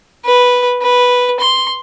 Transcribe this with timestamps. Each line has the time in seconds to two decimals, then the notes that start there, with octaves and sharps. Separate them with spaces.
0.25 B4
0.82 B4
1.40 C6